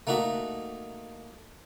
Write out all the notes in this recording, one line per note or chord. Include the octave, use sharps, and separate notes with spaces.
A3 A#3 D#4 F#4 E5